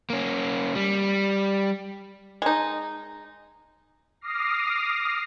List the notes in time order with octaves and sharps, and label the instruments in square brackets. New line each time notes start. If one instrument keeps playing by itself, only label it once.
[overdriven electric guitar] A#3 C#4
G3
[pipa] G#3 D#4
[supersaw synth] D6 D#6 F6 A#6 C7